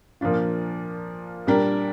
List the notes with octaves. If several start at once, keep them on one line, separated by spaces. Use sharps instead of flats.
A#2 F3 A#3 D4 F4
A#2 G3 D4 A#4